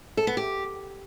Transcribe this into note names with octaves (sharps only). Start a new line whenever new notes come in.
A4
B3
G4